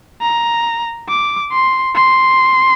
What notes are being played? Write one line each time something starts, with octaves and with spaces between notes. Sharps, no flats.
A#5
D6
C6
C6